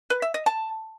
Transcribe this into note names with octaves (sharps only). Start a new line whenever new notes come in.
B4
E5
D#5
A5